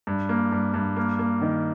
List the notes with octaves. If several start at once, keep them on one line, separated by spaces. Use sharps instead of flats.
G2
A#3
G2
G2
A#3
A#3
D#3